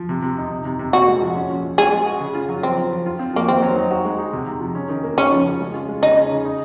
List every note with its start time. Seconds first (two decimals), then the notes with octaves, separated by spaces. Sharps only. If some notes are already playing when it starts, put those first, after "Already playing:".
Already playing: F3
0.09 C3
0.22 C3
0.37 D#4
0.51 C3
0.65 C3
0.79 C3
0.93 A#2 F#4
1.08 G#3
1.22 F3
1.36 C#4
1.50 F3
1.64 F3
1.78 G#3 G#4
1.92 G#3
2.06 F#4
2.20 C#3
2.35 F4
2.49 F#3
2.63 F3 C4
2.77 F4
2.91 F3
3.06 F4
3.19 C4
3.33 F3 A#3
3.48 D#3 C4
3.62 F#3
3.76 D#4
3.91 F#4
4.05 G#3
4.18 D#4
4.33 C3
4.46 C3
4.61 F3
4.75 C#4
4.89 D#3
5.04 A#3
5.17 C#3 C#4
5.32 F3
5.46 C#3
5.60 G#3
5.74 F4
5.88 G#3
6.02 C#3 D#4
6.17 C#4
6.31 C#3
6.45 D#4